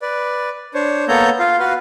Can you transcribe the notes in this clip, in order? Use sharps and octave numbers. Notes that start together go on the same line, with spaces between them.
B4 D5
D4 C5 C#5
A#3 B3 A4 C#5 A#5 G6
F4 F5
F#4 B4 F5